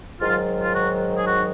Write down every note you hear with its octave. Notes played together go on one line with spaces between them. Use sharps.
G#2 D#3 F#3 F4
F4
F#4
G#4
F#4